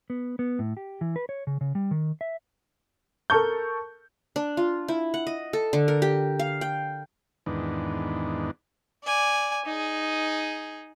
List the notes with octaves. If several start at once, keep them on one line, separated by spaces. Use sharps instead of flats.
B3
B3
A2
G4
E3
B4
C#5
C#3
C#3
G3
D#3
E5
A4 A#4 A5 C#6 G6
D4
F4
E4
F#5
D#5
A4
D3
A#4
G4
F5
G5
E2 G#2 D#3 B3 D4
D5 G#5
D#4 G#4